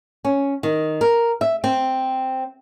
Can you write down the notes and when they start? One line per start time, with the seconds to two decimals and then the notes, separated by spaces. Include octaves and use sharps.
0.25 C#4
0.63 D#3
1.01 A#4
1.41 E5
1.64 C4